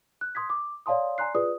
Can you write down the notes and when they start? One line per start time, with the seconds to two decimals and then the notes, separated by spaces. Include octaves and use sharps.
0.21 F#6
0.35 C6 D#6 G#6 B6
0.50 D6
0.86 C#5 D5 F5 A5 C6 D#6
1.18 D5 G#5 A#5 C6 F#6 C7
1.35 F4 G#4 B4 D5 D#6